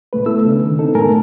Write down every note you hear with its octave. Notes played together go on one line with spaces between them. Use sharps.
C2 A#2 A3 B4
A3 B3 E4 A4 E6
C#3 C#4 D4
D#3
B3 C4 D4 D#4 A4
F#2 A2 A3 A#4 G#5 A5